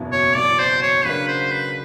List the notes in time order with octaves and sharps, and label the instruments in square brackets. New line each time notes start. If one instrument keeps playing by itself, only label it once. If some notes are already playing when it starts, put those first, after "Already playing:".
Already playing: [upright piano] F#1 E2 B2
[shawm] C#5
[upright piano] F#1 E2 B2 [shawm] D5
[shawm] C5
C#5
[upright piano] C#3 F#3 A#3 D4 F#4 [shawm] B4
[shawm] C5
B4